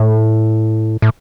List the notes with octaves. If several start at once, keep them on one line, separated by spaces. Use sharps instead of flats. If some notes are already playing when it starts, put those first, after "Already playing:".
Already playing: A2
A2